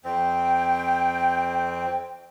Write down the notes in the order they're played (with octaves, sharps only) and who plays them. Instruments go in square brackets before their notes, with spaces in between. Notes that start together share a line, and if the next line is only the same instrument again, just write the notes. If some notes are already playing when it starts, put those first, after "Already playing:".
[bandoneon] F2 C4 [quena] G5